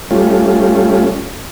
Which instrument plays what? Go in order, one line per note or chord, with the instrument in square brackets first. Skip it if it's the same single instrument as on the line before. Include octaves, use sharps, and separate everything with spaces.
[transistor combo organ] G3 A3 C#4 F4